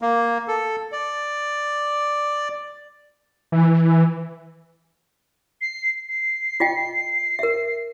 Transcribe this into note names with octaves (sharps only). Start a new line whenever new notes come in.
A#3
A4
D5
E3
C7
C7
F4 D#5 G5
A#4 E5